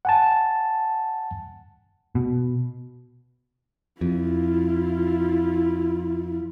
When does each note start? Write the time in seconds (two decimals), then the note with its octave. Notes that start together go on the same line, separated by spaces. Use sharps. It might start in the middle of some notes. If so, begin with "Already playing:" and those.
0.05 F#5 G#5 A5
2.15 B2
4.01 F2 E4 F4